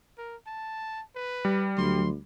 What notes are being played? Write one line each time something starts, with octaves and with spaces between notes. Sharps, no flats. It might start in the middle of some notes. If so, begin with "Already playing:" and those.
A#4
A5
B4
G3
D2 F#3 C6